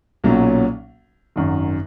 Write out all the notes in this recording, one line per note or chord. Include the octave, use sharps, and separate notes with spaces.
B1 A#2 F#3 C#4
G#1 F#2 D#3